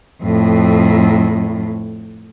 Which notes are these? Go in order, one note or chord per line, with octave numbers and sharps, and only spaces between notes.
F2 A2